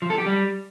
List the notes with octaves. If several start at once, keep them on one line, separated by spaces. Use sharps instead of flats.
F3
A4
G4
G3